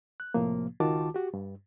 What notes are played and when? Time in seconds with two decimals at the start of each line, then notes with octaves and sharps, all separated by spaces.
0.20 F#6
0.34 C2 A2 C3 F3 A#3
0.80 C#2 D#3 F4 F#4 A5 D6
1.14 F#4 G4
1.34 G2